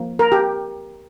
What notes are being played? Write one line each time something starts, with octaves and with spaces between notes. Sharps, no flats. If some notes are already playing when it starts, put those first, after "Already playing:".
Already playing: F3 A#3
A#4
G4